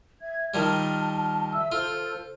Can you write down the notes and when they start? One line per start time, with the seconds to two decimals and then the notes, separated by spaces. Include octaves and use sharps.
0.22 E5 G#6
0.54 D#3 F3 G3 A5
1.53 E5 E6
1.72 F4 A4 C5